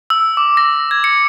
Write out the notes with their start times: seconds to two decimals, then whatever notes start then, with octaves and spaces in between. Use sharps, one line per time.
0.10 E6
0.37 D6
0.57 A#6
0.91 G#6
1.04 C#7